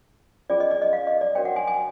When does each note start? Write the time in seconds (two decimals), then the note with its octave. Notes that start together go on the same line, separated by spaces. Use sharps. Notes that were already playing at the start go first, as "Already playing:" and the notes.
0.50 C#4 F4 G#4 D5
0.60 D#5
0.71 D5
0.82 D#5
0.93 F5
1.07 D#5
1.21 D5
1.35 D4 F#4 A#4 C#5 G5
1.45 F#5
1.56 G#5
1.67 G#5